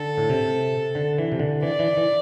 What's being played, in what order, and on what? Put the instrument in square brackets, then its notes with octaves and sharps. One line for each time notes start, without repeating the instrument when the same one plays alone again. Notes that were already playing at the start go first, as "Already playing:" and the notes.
Already playing: [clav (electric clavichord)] D3 [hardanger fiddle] A4
[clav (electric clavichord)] A2
C3
D3
E3
C3
D3
[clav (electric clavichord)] E3 [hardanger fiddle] D5
[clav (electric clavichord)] E3
E3